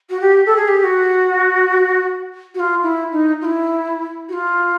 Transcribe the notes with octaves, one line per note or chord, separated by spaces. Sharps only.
F#4
G4
A4
G#4
G4
G4
F#4
F#4
F4
E4
D#4
F4
E4
F#4
F4